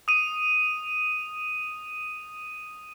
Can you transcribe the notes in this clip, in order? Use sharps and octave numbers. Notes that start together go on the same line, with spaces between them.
D#6 D#7